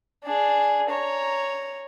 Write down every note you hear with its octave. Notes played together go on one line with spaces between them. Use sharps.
D4 G#4
C#5 A#5